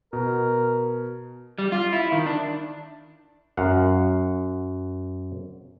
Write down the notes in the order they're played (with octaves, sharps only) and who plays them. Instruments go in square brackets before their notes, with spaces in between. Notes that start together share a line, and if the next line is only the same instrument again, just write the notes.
[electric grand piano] B2 [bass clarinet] A#4
[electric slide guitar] G3
F4
E4
D#3
D4
[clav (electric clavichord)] F#2 F5 F#5